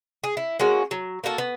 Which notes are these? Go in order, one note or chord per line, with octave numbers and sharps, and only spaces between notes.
G#4
E4
G#3 A#3 C#4 F#4
F#3
A#3 D4 F#4 A4
B3